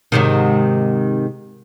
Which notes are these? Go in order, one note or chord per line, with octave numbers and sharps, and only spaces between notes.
G#2 C3 D#3